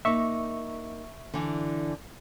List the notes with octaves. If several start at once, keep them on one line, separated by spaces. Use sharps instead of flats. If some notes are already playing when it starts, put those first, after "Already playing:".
A#3 D#4 E5 C#6
D3 E3